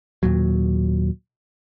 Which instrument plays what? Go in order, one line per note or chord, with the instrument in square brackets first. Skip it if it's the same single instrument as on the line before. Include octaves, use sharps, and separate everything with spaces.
[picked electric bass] D#2 A#2 F#3